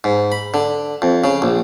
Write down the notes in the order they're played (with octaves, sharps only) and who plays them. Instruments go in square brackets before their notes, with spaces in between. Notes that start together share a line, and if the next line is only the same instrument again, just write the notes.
[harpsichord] G#2
B5
D3
F2
C#3
A#1